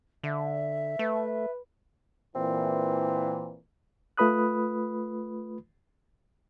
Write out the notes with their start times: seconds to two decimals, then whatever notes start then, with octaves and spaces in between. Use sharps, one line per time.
0.23 D3 E5
0.99 A3 B4
2.35 A#2 E3 C4
4.17 A3 F4 B4 B5 D#6 F#6